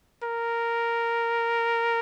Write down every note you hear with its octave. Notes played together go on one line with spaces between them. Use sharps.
A#4